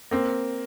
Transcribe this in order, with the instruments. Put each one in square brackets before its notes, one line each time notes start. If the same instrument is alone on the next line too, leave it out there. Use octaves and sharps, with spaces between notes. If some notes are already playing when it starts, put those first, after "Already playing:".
[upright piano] A#3 C4